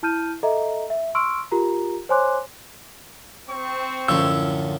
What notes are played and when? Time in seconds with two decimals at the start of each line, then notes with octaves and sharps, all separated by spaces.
0.03 E4 A5 F6 G6 D#7
0.43 A4 D#5 E5 A#5
0.90 E5
1.15 C6 C#6 E6 F6 D7
1.52 F4 G4 A#4 A#5
2.09 C5 C#5 G#5 C6 D6 F#6
3.49 C4 C#6
4.08 F#2 A2 D3 F3 C#4 E6